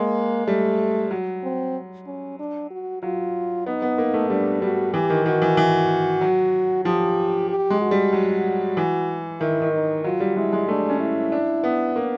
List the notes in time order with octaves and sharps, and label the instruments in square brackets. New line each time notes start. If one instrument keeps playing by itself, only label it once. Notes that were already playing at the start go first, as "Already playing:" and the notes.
Already playing: [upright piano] G#3 [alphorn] A#3
[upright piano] G3 [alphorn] A3
[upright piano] F#3
[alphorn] C4
C#4
D4
F#4
[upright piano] F#3 [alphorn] F4
[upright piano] B3 [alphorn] D#4
[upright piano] B3
A#3
A3
[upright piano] G3 [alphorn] D4
[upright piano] G3 [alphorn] F#4
[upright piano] E3 [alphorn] G4
[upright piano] D#3
[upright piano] D#3 [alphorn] F#4
[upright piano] E3
E3
F#3
[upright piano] F3 [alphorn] G4
[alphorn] G4
[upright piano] G#3
[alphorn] F#4
[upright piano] G3
F#3
E3
[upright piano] D#3 [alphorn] E4
[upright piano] D#3
[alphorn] D#4
[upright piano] F#3 [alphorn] F4
[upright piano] G3
[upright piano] G#3 [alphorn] E4
[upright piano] G#3
[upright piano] A3 [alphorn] D4
[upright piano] C#4
[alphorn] E4
[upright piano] D4
B3
A#3